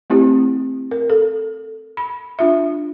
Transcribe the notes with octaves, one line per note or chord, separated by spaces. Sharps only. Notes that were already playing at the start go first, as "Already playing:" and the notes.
A3 C4 E4 G4
A#4
A4
B5
D4 F4 E5